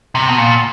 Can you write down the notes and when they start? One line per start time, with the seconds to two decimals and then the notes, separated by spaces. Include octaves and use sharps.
0.15 C3
0.28 B2
0.38 A#2